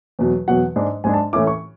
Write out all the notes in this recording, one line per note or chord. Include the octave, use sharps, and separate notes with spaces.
E2 B2 F#3
E2 B2 F#3 F#5
G#2 G#3 D4
G#2 G#3 D4 G#5
A5
A2 E3 A3 C#4 E4 D6
C#6